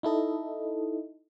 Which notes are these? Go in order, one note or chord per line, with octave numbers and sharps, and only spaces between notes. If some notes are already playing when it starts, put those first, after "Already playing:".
D#4 E4 A4 D#5